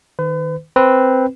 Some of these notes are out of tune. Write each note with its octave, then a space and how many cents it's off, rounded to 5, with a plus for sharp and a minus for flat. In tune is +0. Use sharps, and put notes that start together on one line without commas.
D#3 +0 B4 +40
C4 +0 B4 +0